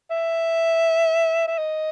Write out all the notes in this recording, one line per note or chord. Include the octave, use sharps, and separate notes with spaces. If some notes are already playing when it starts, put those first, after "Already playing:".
E5
E5
D#5